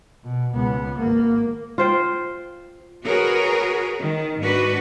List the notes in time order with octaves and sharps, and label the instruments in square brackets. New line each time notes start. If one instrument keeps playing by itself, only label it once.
[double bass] B2
C#2 B3
G#1 A#3
[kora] F4 C5 G5
[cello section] F#4 G#4 A#4 B4 C#5
D#3
G#2 D4 F#4 B4